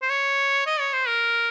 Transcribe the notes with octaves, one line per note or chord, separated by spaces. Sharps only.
C5
C#5
D#5
C#5
C5
A#4